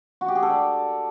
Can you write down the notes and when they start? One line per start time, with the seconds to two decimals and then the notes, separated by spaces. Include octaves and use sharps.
0.21 F#4
0.28 G4
0.35 G#4
0.43 A4
0.50 D5